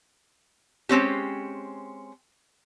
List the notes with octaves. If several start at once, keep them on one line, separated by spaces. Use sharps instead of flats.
G#3 C4 C#4 G4